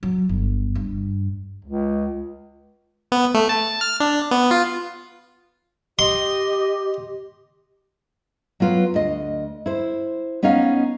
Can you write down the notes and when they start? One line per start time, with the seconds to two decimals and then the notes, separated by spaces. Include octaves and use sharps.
0.03 F#3
0.29 G1
0.75 G2
1.65 C#2
3.12 B3
3.34 A3
3.49 A5
3.81 F6
4.00 D4
4.31 B3
4.51 F4
5.99 G4 D#5 C6
8.60 F#3 B3 F4 B4
8.94 D2 D#5
9.66 E4 C5
10.43 B3 C#4 D#4 D#5 F5